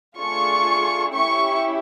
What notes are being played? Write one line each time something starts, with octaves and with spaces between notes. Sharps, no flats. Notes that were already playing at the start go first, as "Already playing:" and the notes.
A3 D4 F4 G#4 C#6
C#4 E4 G4 C#6